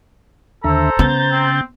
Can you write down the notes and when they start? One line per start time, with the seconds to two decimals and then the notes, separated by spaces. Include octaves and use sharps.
0.64 D#2 D3 A4 C5 E5 A#5
0.99 C#3 B3 G6 A6
1.32 C4